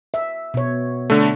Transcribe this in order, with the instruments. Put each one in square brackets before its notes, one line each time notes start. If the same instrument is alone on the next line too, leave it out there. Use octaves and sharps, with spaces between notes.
[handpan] E5
B2 C#5
[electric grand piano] D3 A3